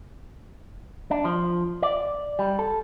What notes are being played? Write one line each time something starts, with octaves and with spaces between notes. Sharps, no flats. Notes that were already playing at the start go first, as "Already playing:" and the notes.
D4
F3
D5
G3
A4